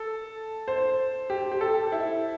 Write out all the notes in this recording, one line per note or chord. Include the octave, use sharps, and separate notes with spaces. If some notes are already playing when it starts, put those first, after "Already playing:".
Already playing: A4
C5
G4
G4
A4
E4